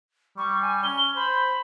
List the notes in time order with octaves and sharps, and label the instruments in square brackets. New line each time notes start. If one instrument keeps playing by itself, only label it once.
[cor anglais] G3 [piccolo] C#6
[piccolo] G#5
[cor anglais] C#4 [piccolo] G7
[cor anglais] C5 [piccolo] B5